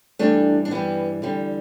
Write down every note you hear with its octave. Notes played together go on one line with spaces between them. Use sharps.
G2 E3 G3 A3 D4
D4
G2 E3 G3 B3
E2 D3 G3